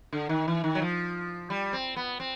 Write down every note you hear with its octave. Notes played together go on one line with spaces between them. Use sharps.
D3
D#3
E3
D#3
F#3
F3
G3
C4
B3
C4